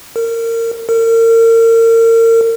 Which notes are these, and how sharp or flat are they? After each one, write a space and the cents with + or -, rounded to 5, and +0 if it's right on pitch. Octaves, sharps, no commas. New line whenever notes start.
A#4 -25
A#4 -35